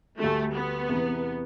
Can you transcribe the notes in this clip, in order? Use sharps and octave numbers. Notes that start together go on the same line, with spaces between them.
D2 D3 G3 A3
B3
E2 C3 E3